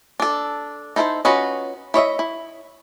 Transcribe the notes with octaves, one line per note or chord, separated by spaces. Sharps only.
D4 A4
D#4 E4 A4 A#4 C5
C#4 F4 F#4 B4 D#5
E4 C#5 D#5 E5
E4